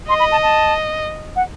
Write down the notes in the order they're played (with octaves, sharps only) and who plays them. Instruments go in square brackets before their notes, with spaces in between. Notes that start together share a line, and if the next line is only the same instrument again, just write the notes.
[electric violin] D#5 [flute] C6
[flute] B5
A5
A5
F#5